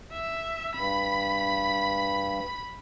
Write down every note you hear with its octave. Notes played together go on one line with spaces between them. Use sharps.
E5
G2 B5